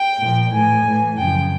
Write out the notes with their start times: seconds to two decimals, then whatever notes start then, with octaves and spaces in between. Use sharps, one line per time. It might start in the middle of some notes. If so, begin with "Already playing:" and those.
Already playing: G5
0.20 A#2 F3
0.52 A2 E3 G#5
0.84 A2 E3
1.17 F#2 C#3 F3 G5